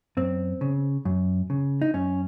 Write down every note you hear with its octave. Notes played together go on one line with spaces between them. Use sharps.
F#2 C4
C#3
F#2
C#3
D#4
F#2 C#4